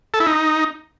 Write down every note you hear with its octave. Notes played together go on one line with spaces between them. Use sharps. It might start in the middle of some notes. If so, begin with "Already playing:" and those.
A4
E4
D#4